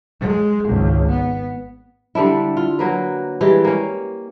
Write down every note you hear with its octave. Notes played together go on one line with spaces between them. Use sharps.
G#3
G#1 C#2
B3
D3 G3 D4 E4
F4
F#3 A#3 B4
E3 G3 G#3 G4
A#3 C#4